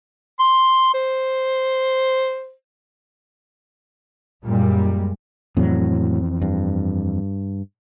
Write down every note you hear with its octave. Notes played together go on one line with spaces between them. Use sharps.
C6
C5
F#2 A#2 G3 G#3
F2 A2 E3 F#3 C4
G2